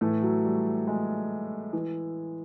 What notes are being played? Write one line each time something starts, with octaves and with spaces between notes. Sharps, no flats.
A2 E3 A3
F#3
G3
G#3
E3